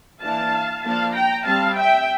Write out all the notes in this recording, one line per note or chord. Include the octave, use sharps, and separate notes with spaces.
E3 A#3 D4 F5 A5
F3 A#3 D4 F5 A5
G5 A#5
G3 C4 F5 A5
E5 G5